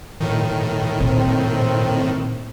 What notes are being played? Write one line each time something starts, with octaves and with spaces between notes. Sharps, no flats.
A2 D#3
A#2 C4